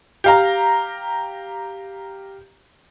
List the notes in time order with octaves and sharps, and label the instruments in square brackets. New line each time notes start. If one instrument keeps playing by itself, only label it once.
[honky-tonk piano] G4 F5 A#5